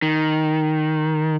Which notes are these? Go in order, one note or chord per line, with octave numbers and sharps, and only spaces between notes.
D#3